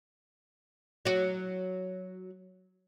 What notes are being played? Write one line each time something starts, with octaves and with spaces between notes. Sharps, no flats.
F#3 F#4